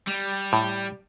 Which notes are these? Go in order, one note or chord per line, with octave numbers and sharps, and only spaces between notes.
G3
A2